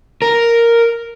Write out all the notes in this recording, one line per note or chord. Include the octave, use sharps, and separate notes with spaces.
A#4